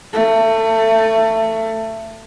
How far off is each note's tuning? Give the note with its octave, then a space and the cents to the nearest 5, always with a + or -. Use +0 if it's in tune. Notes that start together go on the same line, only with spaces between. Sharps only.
A3 +25